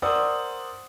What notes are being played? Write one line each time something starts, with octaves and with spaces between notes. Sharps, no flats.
A#4 C5 D5 F#5 D#6 E6